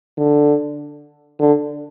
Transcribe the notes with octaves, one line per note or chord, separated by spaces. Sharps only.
D3
D3